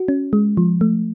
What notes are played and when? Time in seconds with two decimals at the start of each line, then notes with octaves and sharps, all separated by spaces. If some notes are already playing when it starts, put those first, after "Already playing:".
Already playing: F#4
0.08 C#4
0.33 G#3
0.57 F3
0.81 A3